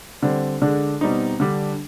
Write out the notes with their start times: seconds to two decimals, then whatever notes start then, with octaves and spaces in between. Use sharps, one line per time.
0.23 D3 G3 C4
0.62 D3 G#3 D4
1.01 B2 G3 C4 D#4
1.40 D3 G3 D4